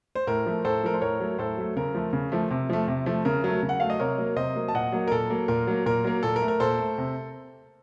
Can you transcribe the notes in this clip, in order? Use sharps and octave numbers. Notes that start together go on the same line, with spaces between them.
C5
A2 A#4
F3 A3
A2 A4 C5
F3 A3 A#4
C5
A2 A#4 C#5
F#3 A3
A2 A4 C5
F#3 A3
C#3 A#4
F3 A3
C#3
F3 A3
C3
F3 A3
C3
F3 A3
C#3 A#4
F#3 A3
C#3
F#5
F#3 A3 F5
D#5
C3 A#4 C#5
F#3 A#3
C3 C5 D#5
F#3 A#3
A5
A#2 D#5 F#5
F#3 A#3
A#4
A#2 A4
F#3 A#3
A#2 A#4
F#3 A#3
A#2 A#4
F#3 A#3
A#2 A4
A#4
A3
A#4
A#2 A4 C5
A3
C3